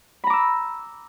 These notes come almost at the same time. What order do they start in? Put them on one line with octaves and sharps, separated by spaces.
B5 A#5 D6 E6